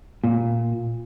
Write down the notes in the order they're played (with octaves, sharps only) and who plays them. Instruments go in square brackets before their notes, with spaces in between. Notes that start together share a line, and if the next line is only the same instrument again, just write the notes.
[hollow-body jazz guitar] A#2